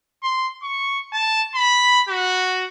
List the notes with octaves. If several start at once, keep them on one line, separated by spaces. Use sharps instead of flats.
C6
C#6
A5
B5
F#4